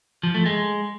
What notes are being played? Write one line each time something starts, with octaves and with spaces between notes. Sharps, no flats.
F3
A3
G#3